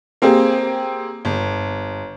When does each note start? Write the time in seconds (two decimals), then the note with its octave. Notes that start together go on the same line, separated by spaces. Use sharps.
0.22 A#3 C4 G4 G#4
1.25 G1